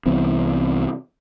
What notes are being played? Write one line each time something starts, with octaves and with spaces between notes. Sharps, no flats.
C2 E3 B3 C4